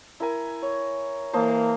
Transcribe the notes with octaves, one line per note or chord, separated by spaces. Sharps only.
E4 A#4 G#5
C#5
E3 A#3 C5 D#5 A5